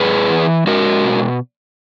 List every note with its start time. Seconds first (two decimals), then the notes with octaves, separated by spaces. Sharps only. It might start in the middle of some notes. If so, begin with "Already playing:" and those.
Already playing: G#2 G#4 B4
0.29 E3
0.67 G#3 F#4 A#4
1.05 B2